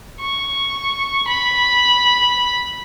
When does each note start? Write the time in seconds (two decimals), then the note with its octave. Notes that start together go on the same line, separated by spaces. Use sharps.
0.21 C#6
1.27 B5